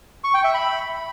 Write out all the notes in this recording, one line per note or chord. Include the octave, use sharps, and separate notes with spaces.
C#6
G5
E5
B5